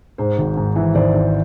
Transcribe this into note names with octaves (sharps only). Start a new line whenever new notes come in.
G#2 C5
G#1
G#2
E3
G#1 C5 D5
G#1